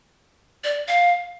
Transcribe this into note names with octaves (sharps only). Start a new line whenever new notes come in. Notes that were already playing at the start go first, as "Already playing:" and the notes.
D5
F5